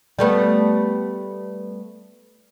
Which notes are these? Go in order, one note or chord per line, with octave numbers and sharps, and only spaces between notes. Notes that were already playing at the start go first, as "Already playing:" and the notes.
G3 A3 B3